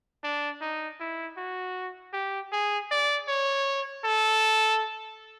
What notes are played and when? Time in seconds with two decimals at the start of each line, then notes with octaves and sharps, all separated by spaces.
0.23 D4
0.61 D#4
1.00 E4
1.37 F#4
2.14 G4
2.52 G#4
2.91 D5
3.28 C#5
4.05 A4